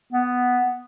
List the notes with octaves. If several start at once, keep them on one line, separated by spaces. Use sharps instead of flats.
B3